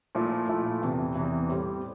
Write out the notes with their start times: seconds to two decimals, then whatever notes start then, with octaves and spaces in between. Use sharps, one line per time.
0.15 A#2 F3 A3 E4
0.48 A#2 F3 A3 E4
0.82 E2 C3 E3
1.15 E2 C3 E3
1.49 A2 G3 C4